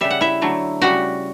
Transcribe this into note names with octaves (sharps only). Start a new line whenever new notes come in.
C#3 G3 E5
F#5
E4 E5
D3 F#3 A3
C#3 G3 F#4 F#5